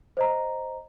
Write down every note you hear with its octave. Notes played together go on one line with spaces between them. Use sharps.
C5 D#5 A#5